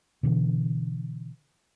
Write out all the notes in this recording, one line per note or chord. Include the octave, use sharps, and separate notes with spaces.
B2 D3 E3